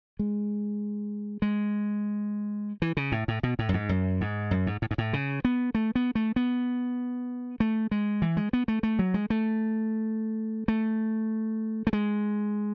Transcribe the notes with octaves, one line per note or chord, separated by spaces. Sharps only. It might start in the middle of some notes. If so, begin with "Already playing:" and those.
G#3
G#3
E3
C#3
A2
A2
B2
A2
F#2
G#2
F#2
G#2
F#2
G#2
A2
G#2
A2
C#3
B3
A3
B3
A3
B3
A3
G#3
E3
G#3
B3
A3
A3
F#3
G#3
A3
A3
A3
G#3